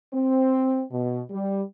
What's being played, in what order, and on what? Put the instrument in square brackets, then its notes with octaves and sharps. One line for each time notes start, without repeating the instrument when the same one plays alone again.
[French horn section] C4
B2
G3